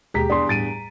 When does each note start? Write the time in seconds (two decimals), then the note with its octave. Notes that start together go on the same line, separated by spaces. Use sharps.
0.14 D#2 B2 G#3 G4 G#4 A#5 B6
0.30 E2 G2 D5 C6 D#6
0.49 A2 G3 A6 D7 D#7
0.68 A#5